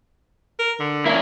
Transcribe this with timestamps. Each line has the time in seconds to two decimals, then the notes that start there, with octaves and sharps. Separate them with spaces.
0.59 A#4
0.79 D3
1.05 A#3 C#4 D4 E4